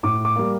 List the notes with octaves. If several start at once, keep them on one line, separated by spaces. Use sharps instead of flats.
A2 D6
D6
G3 A#3